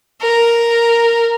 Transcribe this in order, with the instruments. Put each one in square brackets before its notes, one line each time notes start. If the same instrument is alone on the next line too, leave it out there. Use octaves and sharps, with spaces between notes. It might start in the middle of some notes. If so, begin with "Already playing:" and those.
[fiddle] A#4